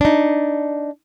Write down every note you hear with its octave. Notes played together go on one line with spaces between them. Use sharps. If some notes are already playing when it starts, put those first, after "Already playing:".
D4 D#4